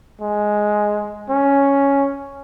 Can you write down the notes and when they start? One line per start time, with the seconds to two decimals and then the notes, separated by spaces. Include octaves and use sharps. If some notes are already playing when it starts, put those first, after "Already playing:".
0.21 G#3
1.30 C#4